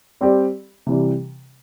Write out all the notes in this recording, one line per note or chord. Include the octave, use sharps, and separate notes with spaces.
G3 C4 G4 D5
C3 E3 G3